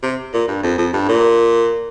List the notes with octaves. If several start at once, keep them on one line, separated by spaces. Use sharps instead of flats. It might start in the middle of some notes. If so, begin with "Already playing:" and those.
C3
A#2
G2
F2
F2
G2
A#2